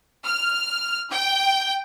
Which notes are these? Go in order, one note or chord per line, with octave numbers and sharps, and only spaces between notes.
F6
G5